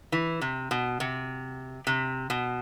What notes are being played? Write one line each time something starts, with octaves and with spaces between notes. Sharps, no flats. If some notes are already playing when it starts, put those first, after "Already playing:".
E3
C3
B2
C3
C3
B2